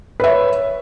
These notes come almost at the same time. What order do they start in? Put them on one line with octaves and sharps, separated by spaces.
B4 E5 C#5